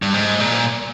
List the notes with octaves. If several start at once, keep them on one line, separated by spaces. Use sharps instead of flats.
G2
G#2
A#2